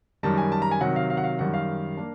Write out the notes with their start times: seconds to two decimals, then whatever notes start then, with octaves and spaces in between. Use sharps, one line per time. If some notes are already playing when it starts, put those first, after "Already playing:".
0.23 F#2 D#3 G3 A5
0.37 G#5
0.52 A5
0.62 A#5
0.71 G#5
0.81 C3 D#3 F#3 F#5
0.96 F5
1.10 F5
1.17 F#5
1.24 F5
1.39 F#2 D#3 G3 F#5
1.54 F5
1.97 A#3 D4